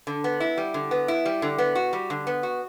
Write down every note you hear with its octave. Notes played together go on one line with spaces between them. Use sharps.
D3
B3
E4
G3
D3
B3
E4
G3
D3
B3
F#4
G3
D3
B3
F#4